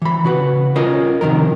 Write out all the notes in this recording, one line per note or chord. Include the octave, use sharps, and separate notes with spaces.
E3 B5
C#3 F#4 B4
C#4 F4 A#4 D#5
C3 D#3 F3 A#4